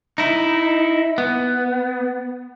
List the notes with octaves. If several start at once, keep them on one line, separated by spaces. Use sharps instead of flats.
D#4 E4
B3